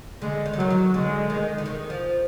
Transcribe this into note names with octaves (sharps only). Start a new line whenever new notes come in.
D3 G#3
D#3
D3
D#3 F#3
F#3
D3 G#3
D#3
D3
D#3
F3